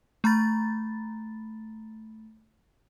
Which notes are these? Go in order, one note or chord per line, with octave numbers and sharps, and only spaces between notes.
A3 A#5 B5 A6